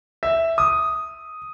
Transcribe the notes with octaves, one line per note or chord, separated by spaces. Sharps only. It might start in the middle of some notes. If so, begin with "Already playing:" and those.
E5
D#6